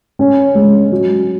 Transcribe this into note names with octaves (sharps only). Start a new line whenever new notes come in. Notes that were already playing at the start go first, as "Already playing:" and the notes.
C#4
G#3
F#3